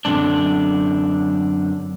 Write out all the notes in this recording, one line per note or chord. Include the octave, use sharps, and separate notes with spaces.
F#2 D3 F3 C4 D4